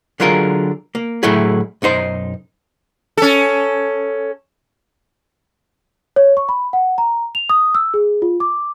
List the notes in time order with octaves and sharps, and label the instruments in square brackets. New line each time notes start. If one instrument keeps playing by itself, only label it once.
[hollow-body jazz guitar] D3 F#3 F4 G#4 A#4
A#3
A2 F#3 A3 E4 G#4
B1 F#2 D#4 C5
[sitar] C#4 A4
[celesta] C#5
C#6
B5
F#5
A#5
F7
D#6
E6
G#4
F4
D6